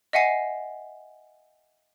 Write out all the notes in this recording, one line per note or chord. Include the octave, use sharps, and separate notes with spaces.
D#5 E5 F#5 G#5 C7